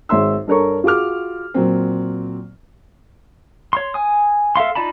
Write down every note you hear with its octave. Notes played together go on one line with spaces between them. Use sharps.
G#1 G#3 C#5 E5 C6 E6
G2 A4 A#4 C#5 C#6
F4 F#4 G#4 D6 F6
A#2 F#3 C4
C#5 C6
G#5 D#6
A4 E5 F5 C6
D#4 F4 D5 A5 B5